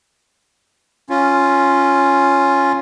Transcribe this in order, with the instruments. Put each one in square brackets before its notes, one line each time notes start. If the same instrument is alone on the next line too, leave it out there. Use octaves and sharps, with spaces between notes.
[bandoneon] C#4 F4